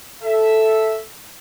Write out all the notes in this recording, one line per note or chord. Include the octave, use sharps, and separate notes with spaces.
A4 E5